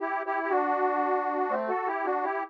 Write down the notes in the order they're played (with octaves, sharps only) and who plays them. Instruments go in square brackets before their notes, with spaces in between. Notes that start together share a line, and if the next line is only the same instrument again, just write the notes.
[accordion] E4 G4
E4 G4
G4
D4 F#4
A3 C4
F#4 A4
E4 G4
D4 F#4
E4 G4